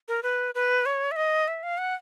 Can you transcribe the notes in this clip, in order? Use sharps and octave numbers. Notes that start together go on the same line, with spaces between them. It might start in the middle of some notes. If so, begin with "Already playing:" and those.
A#4
B4
B4
C#5
E5
D#5
E5
F5
F#5